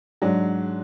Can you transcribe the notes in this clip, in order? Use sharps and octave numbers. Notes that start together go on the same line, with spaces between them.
G#2 F#3 D4